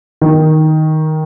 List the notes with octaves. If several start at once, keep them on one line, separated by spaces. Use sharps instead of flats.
D#3